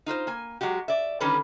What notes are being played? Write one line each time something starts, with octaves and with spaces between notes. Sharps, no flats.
D#4 F4 B4 C5
A#3 G#5
F#3 G#3 F#4 G4
D5 E5
D3 D#3 G3 C#4 A4 B4